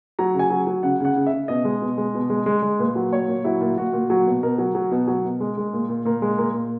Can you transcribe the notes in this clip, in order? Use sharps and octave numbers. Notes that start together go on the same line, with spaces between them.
F#3 A#5
C#3 G#5
F#3
F#3
C#3 F#5
C#3 F#5
C#3
E5
C#3
B2 D#5
G#3
B2
G#3
B2
G#3
G#3
G#3
A#2 B4
F#3
A#2 C#5
A#2
F#3 E4
A#2
A#2 F#4
A#2
F#3 F#4
B2
B2 A#4
F#3
F#3
B2
F#3
B2
G#3
G#3
A#2
A#2
A#2 A#4
G#3
A#2 A#4
A#2